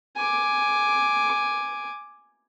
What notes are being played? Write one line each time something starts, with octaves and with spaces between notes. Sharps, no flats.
G#5 D6